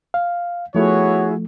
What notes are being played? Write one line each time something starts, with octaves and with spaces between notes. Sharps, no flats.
F5
F3 A3 B3 E4 F#4 G#4 C#5